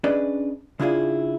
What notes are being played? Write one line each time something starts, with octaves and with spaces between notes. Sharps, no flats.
C#4 D4 G#4 B4 D5 D#5
C#3 D4 E4 F4 G#4